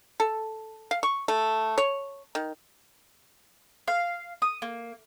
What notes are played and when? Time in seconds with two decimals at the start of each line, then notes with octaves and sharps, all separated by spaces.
0.20 A4
0.91 F5
1.03 C#6
1.28 A3
1.78 C#5
2.35 D#3
3.88 F5
4.42 D#6
4.62 A#3